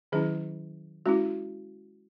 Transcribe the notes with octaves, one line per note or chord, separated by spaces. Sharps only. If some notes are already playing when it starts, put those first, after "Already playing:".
D#3 F#3 C#4 E4 G#4
G#3 C#4 E4 F#4